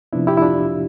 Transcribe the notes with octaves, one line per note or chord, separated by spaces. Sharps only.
C3 F3 B3 D4 E4
E4 G4
E4
D4 F4